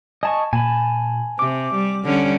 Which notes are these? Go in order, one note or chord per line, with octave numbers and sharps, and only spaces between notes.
D#5 G#5 A5 C#6
A#2 G#5 A5 B5
C3 D6
G3
D3 G3 C#4